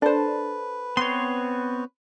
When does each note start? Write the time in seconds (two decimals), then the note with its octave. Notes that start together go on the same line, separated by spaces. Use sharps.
0.02 D4 A4 B4 C5
0.97 B3 C4 C#5 C6